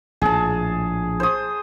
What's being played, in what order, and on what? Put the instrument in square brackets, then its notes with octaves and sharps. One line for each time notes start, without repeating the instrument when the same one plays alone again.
[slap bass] A#1 A2 [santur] G#4 A5
[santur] C5 D#6